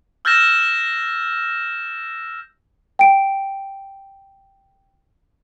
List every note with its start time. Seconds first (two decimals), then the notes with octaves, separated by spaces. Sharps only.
0.25 E6 F6 G6 A6 A#6 E7
2.99 G5 D7